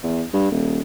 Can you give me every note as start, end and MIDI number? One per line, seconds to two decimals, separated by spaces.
0.03 0.23 40
0.33 0.48 43
0.52 0.82 27